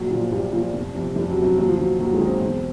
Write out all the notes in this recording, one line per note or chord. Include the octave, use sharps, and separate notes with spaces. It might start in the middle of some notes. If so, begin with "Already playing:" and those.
Already playing: A#1 F#3
A#2 F3
A#1 G3
A#2 F3
F1
F2 C3
F1 G3
F#3
C3
F2 F#3
D#2 F#3
F3
D#3 F#3
D#2 F#3
G#3
D#3
C4
E1